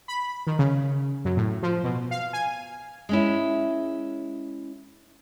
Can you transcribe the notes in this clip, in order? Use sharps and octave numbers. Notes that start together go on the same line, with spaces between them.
B5
D#3
C#3
F#2
A2
F3
B2
F5
G#5
G#3 C#4 E4